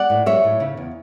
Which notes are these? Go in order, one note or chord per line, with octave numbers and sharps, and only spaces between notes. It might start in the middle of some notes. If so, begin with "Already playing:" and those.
Already playing: D5 F#5
A2
F#3 C#5 E5
A2
C#3
E2